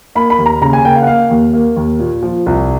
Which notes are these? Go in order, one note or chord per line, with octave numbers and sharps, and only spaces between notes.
A#3 B5
B5
D#2
A#5
C#3 A#5
G#5
A#3 G5
F5
F#5
A#3 F5
D#2
A#3
D#2
A#2
F3
C2